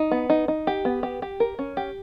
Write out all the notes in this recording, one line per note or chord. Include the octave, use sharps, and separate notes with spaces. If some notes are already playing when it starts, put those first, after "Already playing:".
Already playing: D#4
B3
D#4
D#4
G4
B3
G4
G4
A#4
C#4
G4